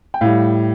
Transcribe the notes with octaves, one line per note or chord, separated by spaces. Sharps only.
G5
A2 G3 F5